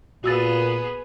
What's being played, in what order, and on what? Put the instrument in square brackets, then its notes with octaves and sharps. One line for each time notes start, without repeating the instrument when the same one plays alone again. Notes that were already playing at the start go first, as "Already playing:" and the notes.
[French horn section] A#2 [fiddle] B3 G#4 [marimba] F#4 E6 A6